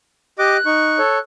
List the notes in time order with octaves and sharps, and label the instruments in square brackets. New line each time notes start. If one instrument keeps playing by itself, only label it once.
[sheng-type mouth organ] G4 D#5 D6 [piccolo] F#6
[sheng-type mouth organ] D#4 C#6
A4 C#5